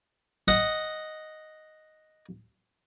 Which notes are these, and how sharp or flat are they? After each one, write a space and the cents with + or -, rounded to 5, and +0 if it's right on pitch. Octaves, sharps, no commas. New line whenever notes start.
D#5 +0 F#5 +0